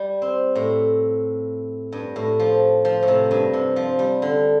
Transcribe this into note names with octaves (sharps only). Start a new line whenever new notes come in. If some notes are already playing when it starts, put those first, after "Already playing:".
Already playing: G3
C4
A2
G2
A2
F3
F3
A2
C3
G2
C3
F3
G3
D3